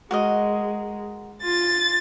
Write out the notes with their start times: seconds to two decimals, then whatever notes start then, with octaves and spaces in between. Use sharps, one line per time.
0.11 G#3 F#4 A#4 D#5
1.43 F4 A6